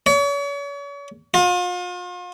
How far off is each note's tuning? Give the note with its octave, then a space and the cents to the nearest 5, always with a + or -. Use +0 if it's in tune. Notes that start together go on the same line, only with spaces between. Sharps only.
C#5 +40
F4 +40